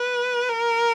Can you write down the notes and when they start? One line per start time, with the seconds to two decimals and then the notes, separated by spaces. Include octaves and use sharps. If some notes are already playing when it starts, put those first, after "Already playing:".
Already playing: B4
0.49 A#4